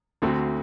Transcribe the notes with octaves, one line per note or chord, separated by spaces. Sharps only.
D2 D3 A3 C4 F#4